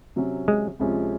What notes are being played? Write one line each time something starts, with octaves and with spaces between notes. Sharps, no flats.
C3 F#3 C#4
G#3
C#2 C3 F3 G#3 C#4